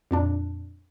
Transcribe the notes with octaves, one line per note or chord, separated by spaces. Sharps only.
F2 A#2 D4